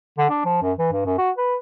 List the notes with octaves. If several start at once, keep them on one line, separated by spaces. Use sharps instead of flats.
D3
D4
F3
F#2
E3
G2
F#2
F#4
B4